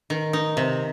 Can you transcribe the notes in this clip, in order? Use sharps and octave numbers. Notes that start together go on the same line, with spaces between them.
D#3
D#4
C3